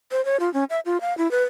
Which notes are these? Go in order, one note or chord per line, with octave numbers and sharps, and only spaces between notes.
C5
C#5
F4
C#4
E5
F4
F5
E4
B4